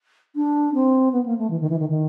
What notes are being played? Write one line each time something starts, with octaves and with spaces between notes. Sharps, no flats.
D4
C4
B3
A#3
A3
E3
D#3
E3
D#3
D#3